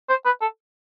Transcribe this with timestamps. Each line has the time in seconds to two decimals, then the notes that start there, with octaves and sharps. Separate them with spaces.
0.09 C5
0.25 B4
0.41 A4